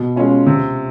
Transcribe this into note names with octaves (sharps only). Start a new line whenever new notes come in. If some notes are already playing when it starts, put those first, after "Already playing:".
Already playing: B2
G#3 C#4 F4
C3